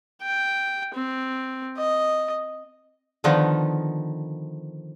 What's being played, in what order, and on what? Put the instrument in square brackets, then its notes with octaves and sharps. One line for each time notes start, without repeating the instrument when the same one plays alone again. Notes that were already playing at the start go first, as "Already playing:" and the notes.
[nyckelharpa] G5
C4
D#5
[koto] D3 D#3 F3 B3 D#4